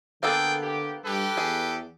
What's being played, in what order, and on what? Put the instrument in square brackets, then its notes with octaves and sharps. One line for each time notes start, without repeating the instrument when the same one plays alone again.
[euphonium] D3 [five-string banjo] A#3 B3 A4 [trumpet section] G#4 D5 G5
[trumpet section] G4
[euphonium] G2 [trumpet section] G4 A4 B4
[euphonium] E2 [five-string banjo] G#4